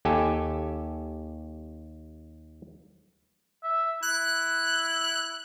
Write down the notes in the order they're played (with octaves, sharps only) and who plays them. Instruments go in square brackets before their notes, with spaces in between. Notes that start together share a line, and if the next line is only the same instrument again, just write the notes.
[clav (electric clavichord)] D#2 G4 A4 G#5
[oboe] E5
[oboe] E4 [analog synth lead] F#6